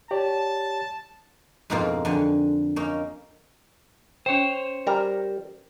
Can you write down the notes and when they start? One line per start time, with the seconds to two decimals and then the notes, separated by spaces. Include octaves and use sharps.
0.11 G4 C#5 D5 A5
1.70 F2 G#2 B2 A#3 C4 F4
2.05 F2 D3 G#5
2.76 A#3 C#4 D#4
4.26 C#4 C5 C#5 G5
4.87 G3 A#4 A#5